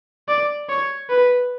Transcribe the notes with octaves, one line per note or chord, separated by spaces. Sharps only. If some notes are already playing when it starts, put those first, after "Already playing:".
D5
C#5
B4